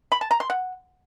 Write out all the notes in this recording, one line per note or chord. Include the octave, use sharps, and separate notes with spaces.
B5
A5
A#5
C6
F#5